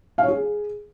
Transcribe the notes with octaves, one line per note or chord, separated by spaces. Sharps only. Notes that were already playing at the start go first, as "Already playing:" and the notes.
F5
C#5
G#4